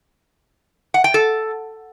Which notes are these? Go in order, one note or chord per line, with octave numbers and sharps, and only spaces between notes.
F#5
G5
A4